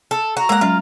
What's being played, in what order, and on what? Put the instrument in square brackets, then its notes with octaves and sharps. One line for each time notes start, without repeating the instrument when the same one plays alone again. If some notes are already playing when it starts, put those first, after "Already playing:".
[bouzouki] A4
[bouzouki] F#4 [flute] A#5
[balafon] G#3 [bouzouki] A#3 F#5
[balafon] F#3 C#4 [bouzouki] F4